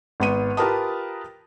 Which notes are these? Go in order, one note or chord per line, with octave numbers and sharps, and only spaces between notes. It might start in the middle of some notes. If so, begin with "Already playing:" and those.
G#1 B3 D#7
F4 G4 A#4 B4 A5 D#6